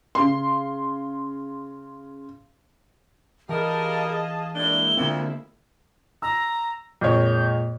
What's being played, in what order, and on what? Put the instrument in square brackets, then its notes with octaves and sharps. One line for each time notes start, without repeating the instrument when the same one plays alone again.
[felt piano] C#3 C6
[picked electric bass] E3 [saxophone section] G3 A#4 [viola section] G#4 D#5 F5 [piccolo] A5
[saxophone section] A2 D4 [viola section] G#3 A#3 E4 [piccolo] G7
[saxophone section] D2 F3 [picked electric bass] D3 C4
[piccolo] A#5 [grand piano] E6
[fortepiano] F2 C#5 [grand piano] A#2 G#3 [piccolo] G6